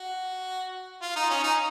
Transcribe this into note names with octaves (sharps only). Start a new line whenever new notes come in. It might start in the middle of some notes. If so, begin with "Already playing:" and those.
Already playing: F#4
F4
D#4
C#4
D#4